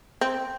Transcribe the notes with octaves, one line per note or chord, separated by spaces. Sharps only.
C4